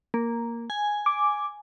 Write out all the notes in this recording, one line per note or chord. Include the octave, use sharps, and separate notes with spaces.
A#3
G#5
D6